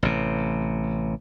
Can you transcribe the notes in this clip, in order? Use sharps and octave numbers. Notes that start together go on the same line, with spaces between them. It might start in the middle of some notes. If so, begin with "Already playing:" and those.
A1 C3